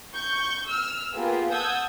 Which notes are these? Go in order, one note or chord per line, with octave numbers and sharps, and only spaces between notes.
C#6 G6
E6 F6
A#3 B3 F4 G4 G#4 B4
F#5 A5 D#6 E6 G6 G#6